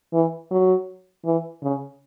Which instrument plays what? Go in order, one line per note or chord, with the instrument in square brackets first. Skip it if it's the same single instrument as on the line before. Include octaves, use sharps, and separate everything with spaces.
[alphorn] E3
F#3
E3
C#3